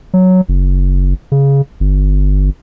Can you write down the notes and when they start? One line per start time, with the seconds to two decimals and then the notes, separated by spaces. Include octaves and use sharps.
0.14 F#3
0.49 F#1
1.32 C#3
1.80 G1